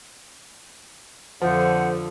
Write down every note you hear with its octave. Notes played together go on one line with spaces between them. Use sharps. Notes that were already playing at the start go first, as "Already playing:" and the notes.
F2 D3 F3 C5 F#5